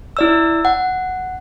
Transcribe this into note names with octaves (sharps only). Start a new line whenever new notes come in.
E4 D5 E6
F#5